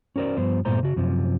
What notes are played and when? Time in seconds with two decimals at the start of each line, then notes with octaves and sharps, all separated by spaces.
0.16 C#4 F#4 A#4 C5 D5
0.37 G2 F3 B3 C5
0.65 G2 A#2 A3 B3 C5 A#5
0.83 C#3 F#4
0.96 F#2 C3 F3